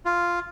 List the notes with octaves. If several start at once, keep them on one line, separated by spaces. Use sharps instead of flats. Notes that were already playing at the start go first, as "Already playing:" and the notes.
F4